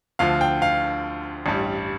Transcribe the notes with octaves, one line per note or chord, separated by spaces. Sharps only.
D2 D3 F3 F5
G5
F5
A1 G2 G3